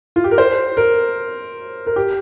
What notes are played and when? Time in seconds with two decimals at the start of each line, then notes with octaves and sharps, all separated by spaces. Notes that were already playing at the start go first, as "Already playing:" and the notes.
0.16 F4
0.24 G4
0.31 A#4
0.38 C5
0.77 A#4
1.87 A#4
1.96 G4